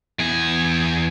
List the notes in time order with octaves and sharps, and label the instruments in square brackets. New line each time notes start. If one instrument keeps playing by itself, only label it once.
[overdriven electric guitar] E2 G#4